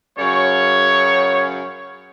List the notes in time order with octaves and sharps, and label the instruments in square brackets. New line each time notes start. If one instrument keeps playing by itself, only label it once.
[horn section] F#2 C#3 F#3 C#5